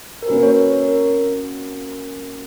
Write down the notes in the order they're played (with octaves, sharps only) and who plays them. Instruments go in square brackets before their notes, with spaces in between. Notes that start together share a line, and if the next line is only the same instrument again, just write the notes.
[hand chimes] A#4
[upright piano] A#3 C#4 F#4 [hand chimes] B4
[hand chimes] C#5
C#5
A#4
A#4